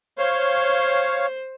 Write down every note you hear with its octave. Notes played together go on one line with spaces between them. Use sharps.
C5 C#5 F5